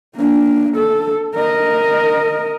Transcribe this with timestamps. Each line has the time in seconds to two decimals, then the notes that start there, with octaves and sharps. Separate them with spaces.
0.16 A#3 D4
0.76 A4
1.35 A#4 D#5